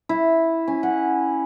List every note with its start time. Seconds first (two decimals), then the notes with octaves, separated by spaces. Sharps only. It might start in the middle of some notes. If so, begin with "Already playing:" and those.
0.09 E4
0.68 C#4
0.83 F#5